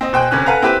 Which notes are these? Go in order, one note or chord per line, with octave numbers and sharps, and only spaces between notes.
C4 D#5
B2 C5 G5 G#5 F#6
D2 C3 C#4 F#6
A4 B4 F5 F#5 G#5 A#5
C4 E4 G4 B4